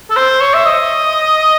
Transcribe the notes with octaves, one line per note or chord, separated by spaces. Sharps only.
A4
C5
C#5
E5
D#5